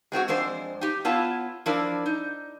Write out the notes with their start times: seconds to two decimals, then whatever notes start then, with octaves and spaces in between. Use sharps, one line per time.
0.12 G#3 C4 F4 F#4
0.28 F2 G#3 D4 C5
0.81 D#4 G4
1.05 B3 E4 F4 C#5 A5
1.66 F3 D4 E4 A#4 D5
2.06 D#4